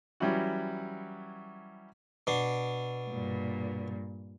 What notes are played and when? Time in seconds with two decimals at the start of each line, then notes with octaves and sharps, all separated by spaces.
0.20 E3 F#3 G3 C#4 E4 F#4
2.27 B2 D4
3.10 G2 A#2